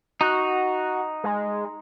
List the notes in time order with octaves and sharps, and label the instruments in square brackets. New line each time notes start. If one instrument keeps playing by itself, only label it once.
[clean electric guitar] D#4 [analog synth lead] F#4
[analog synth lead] G#3